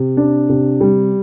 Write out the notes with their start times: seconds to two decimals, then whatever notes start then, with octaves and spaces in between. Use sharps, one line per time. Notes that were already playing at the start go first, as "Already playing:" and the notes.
Already playing: C3
0.17 D4
0.49 C3
0.81 G3